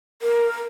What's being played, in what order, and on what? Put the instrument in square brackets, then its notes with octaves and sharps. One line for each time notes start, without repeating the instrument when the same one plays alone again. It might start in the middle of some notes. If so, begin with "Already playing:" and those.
[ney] A#4